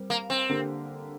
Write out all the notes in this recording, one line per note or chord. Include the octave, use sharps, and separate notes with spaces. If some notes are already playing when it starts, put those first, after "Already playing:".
Already playing: G3 C4 A#4
A#3
C4
D3 A#3 G4 A#4